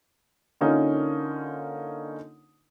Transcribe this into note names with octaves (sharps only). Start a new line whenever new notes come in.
D3 A#3 C#4 D#4 F4 A#4